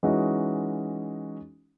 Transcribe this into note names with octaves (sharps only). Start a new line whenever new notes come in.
E3 G#3 C#4 D#4 F#4 D#5